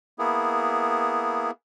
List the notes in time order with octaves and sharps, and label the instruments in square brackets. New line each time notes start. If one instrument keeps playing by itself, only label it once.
[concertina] A#3 B3 E4 G#4